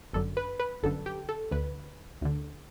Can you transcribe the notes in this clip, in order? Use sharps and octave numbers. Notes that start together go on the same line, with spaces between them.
G1 F#2 D3 A4
B4
B4
G1 F#2 D3 A4
G4
A4
D2 D3 B4
D2 D3